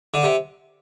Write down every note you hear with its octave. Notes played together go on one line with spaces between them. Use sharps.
D3
C3